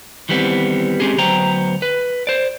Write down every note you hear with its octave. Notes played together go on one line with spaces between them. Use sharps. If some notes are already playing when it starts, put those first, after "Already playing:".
D#3 E3 G3 A3 B3 C4
G#3 C4 C#4 G4 G#4
D2 F#3 B3 C5 G5 A#5
B4
C5 D5